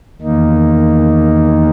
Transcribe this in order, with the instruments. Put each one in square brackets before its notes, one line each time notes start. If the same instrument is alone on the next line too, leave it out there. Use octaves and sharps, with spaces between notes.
[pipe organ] E2 D#3 A#3 D#4